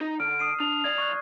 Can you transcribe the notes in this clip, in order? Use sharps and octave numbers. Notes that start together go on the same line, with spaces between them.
D#4
D3 F6 D7
D#6 C7 D#7
D4 F7
B1 D5 G#6 C7
C#6 F#6